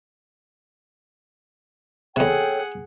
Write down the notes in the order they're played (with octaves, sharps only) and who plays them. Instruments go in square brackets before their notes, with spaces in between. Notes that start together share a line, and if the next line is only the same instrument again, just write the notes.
[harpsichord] E2 C3 [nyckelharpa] G#4 F#5 [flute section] A4 C#5 G5